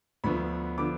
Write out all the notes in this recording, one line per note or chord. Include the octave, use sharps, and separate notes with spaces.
D2 D3 F3 B3 B5
D3 F3 B3 D6